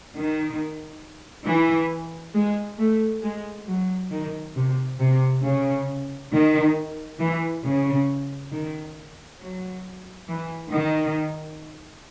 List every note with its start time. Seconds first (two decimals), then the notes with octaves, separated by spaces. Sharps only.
0.15 D#3
1.47 E3
2.34 G#3
2.78 A3
3.23 G#3
3.67 F#3
4.11 D#3
4.55 C3
4.99 C3
5.43 C#3
6.32 D#3
7.19 E3
7.64 C#3
8.52 D#3
9.40 F#3
10.28 E3
10.71 D#3